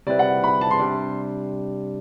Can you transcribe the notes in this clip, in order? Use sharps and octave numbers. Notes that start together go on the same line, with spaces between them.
C3 G3 C4 E4 B4 D5
F#5
B5
A5
C6
C3 G3 D4